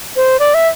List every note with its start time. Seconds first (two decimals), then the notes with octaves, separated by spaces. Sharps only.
0.16 C5
0.40 D5
0.54 E5